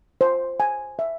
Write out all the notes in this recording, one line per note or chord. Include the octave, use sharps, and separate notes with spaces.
C5
G#5
E5